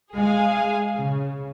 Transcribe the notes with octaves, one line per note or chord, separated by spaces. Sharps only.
G#3 G#4 F5 G#5
C#3